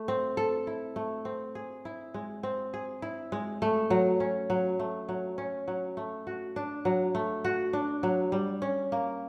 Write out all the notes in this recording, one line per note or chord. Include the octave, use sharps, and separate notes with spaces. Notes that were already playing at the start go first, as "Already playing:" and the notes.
Already playing: A3
C4
A4
E4
A3
C4
G#4
E4
G#3
C4
G#4
E4
G#3
A3
F#3
C#4
F#3
A3
F#3
C#4
F#3
A3
F#4
D4
F#3
A3
F#4
D4
F#3
G3
C#4
A#3